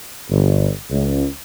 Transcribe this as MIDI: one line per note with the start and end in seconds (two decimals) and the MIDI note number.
0.30 0.68 31
0.90 1.25 37